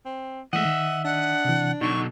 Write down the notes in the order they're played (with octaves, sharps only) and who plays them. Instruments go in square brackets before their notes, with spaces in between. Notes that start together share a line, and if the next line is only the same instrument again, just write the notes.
[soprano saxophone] C4
[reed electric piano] E3 G#3 A3 [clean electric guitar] D#5 E5 [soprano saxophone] F#5
[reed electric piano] D#3
[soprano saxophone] D4 [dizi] F#5
[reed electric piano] C3 E3
[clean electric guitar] B2 D3 F#3 [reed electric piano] D#4 [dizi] C#6